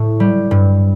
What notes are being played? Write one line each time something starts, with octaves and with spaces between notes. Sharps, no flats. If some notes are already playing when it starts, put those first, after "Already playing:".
Already playing: A2
G3
G2